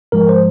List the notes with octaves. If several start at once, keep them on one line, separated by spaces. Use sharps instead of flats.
G#2 F3 G#3 A#4
C5